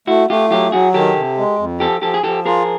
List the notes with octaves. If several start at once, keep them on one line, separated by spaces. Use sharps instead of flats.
A3 E4 F#4
A3 F4 G4
F#3 F4 G4
F#3 F#4 G#4
D#3 G4 A4
C3
G#3
F2
F3 G4 A4
F3 G4 A4
G#4
F3 G4 A4
F4 G#4 A#4